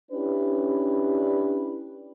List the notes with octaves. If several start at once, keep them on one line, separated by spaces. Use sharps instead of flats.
C#4 D4 E4 G4 B4